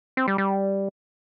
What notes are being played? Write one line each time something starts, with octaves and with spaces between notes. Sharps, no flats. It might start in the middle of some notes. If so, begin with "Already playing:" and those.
C4
G3
G3